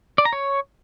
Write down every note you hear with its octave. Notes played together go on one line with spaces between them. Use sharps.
D5
A#5
C#5